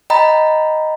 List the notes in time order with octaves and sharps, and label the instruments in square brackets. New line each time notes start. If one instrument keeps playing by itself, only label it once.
[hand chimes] D#5 G5 A#5 B5